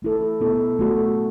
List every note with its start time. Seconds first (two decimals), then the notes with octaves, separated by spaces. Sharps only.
0.02 A3 E4 A4
0.40 B2 B3 E4 A4
0.79 A3 F#4 A4